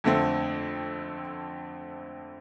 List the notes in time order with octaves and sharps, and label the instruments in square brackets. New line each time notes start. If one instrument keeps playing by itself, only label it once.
[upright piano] F2 D3 A3 C4